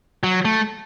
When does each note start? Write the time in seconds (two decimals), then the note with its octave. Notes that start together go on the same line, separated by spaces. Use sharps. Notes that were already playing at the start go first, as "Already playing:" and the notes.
0.24 F#3
0.45 A3